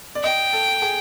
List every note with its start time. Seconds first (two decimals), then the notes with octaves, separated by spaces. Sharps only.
0.15 D5
0.24 D#5 G5
0.53 A4
0.82 G#4